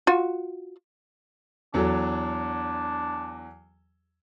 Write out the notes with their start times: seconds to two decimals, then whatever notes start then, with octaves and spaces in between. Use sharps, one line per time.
0.07 F4 F#4
1.74 E2 F#3 D4 A4